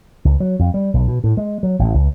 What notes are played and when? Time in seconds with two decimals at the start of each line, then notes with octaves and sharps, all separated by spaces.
0.25 C#2
0.40 F#3
0.59 F2
0.74 G3
0.94 B1
1.08 B2
1.24 A2
1.37 G#3
1.63 F#3
1.79 A1
1.94 C#2